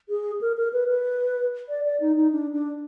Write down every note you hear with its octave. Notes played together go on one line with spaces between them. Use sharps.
G#4
A#4
A#4
B4
B4
D5
D5
D#4
D#4
D4
D4